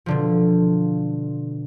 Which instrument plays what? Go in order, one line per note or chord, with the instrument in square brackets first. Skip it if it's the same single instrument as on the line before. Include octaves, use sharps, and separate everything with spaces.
[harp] B2 D3 F3